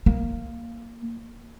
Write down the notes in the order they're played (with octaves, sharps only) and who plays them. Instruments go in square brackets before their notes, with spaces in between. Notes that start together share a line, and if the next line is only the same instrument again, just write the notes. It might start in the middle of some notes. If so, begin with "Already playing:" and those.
[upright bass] A#3